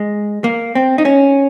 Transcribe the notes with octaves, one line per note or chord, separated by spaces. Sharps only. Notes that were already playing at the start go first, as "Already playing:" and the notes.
Already playing: G#3
A#3
C4
D#4
C#4